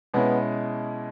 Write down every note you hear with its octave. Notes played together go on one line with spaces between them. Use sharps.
B2 G#3 B3 C#4 E4